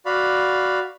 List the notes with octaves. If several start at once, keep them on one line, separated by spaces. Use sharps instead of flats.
F#4 D5 F5 B5